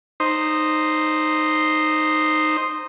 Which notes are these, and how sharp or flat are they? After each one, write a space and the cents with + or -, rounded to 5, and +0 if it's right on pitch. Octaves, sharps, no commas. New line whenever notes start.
D#4 -10 C5 +0